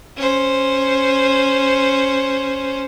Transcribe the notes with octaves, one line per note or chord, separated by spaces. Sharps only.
C#4 C5